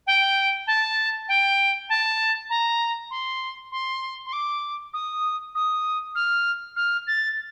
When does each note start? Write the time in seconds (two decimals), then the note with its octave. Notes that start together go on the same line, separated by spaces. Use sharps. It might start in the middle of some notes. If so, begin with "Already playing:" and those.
0.06 G5
0.66 A5
1.28 G5
1.89 A5
2.49 A#5
3.10 C6
3.71 C6
4.25 C6
4.32 D6
4.93 D#6
5.55 D#6
6.15 F6
6.76 F6
7.07 A6